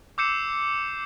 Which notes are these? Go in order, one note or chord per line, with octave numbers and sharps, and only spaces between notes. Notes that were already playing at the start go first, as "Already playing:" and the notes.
D6 E6 G6 C7 C#7 E7